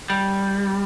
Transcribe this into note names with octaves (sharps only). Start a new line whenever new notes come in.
G3